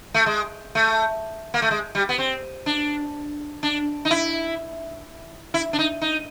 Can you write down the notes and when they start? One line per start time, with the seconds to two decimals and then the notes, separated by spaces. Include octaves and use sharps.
0.14 A3
0.26 G#3
0.75 A3
1.54 A#3
1.62 A3
1.71 G#3
1.95 G3
2.09 B3
2.18 C4
2.66 D4
3.63 D4
4.05 D#4
4.11 E4
5.54 E4
5.73 D4
5.79 D#4
6.01 D#4